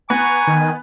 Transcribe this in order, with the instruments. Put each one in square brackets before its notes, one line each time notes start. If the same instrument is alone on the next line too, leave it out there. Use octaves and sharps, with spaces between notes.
[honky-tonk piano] B3 [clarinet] G#5 [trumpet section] A#5 C#6
[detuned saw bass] D#3